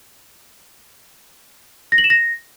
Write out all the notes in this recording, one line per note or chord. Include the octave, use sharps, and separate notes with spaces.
A#6
F#7
E7
A#6